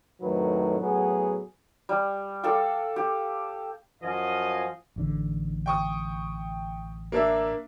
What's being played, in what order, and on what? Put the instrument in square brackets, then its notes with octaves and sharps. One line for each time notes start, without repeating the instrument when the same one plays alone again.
[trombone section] F2 A2 D#3 F#3 B4
A2 F#3 B3 G#4
[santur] G3
A4 D5 F5 G5
G4
[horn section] F#2 F3 F#4 D#5 F5 G#5
[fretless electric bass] A1 D3
[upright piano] G5 C#6 D#6
A#3 D4 E5